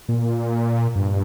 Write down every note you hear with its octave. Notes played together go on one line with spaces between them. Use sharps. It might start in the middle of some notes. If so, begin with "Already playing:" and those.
A#2
G2